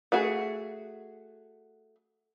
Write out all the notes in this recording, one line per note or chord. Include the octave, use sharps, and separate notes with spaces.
A3 F#4 G#4